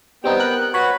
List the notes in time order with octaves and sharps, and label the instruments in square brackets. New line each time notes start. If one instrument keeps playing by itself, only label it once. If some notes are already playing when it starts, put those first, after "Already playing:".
[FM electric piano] G3 C4 D#4 [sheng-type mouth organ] B3 G5
[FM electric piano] A#4 F#6
[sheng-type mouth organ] F#4 B4 [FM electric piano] C#5 B5